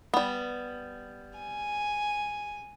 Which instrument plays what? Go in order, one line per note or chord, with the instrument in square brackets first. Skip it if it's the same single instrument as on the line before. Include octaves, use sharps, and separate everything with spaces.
[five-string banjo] G3 B3
[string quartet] G#5